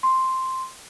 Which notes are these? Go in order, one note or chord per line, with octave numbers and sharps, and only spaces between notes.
C6